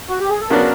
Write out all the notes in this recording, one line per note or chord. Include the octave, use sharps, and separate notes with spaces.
F#4
G4
G#4
A4
C#3 F#3 B3 D4 A#4